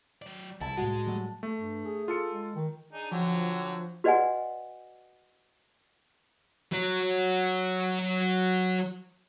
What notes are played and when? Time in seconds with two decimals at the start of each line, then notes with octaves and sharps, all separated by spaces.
0.22 F#3 D5
0.61 C2 E4 A5
0.77 A2 G#3 F#4
1.06 F#3 G3 A3
1.43 A3
1.57 G2
1.85 G#4
2.08 F4 A4 C#7
2.32 G#3
2.56 D#3
2.93 D4 D#4 G#4
3.11 D3 F3 F#3 G5
4.04 F#4 B4 D5 D#5 F#5 G#5
6.72 F#3 F#4